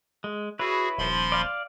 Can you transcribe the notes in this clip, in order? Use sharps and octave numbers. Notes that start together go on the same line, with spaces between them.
G#3
E4 F#4 G#4 B4 C#5
D#1 F3 B5 C6
D5 F5